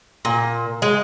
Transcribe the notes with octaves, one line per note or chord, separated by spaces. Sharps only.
A#2
G#3